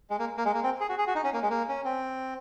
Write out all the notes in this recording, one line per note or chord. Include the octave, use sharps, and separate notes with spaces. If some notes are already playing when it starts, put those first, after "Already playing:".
G#3
A#3
A#3
G#3
A#3
C4
G#4
F#4
G#4
F#4
D#4
C#4
A#3
G#3
A#3
C#4
C4